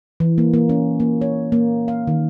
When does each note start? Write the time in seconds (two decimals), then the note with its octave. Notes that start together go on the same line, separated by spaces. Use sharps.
0.20 E3
0.38 A#3
0.54 A#3
0.69 C#4
1.00 A#3
1.21 C#5
1.52 A#3
1.88 F5
2.07 D#3